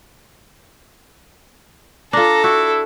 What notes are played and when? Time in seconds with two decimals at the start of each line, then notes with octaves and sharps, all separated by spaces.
2.13 D4 F4 A4 A#5
2.44 E4 F#4